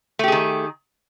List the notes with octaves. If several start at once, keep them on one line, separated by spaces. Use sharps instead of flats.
D#3 A3 G4 G#4